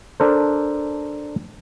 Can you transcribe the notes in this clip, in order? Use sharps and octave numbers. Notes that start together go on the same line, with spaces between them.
D4 A4 A#4 C5